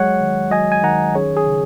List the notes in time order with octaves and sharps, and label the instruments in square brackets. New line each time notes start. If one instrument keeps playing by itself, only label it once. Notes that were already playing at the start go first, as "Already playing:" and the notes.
Already playing: [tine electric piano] F#3 G#3 C#5 F#5
D#3
F#3 D#5 G#5
G#5
D#3 F#5 A#5
C#4 G#4 C#5
G#4
C#3